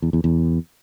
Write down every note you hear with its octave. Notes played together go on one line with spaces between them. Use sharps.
E2
E2
E2